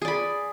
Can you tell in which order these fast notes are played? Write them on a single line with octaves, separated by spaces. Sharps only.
G#4 D5 B5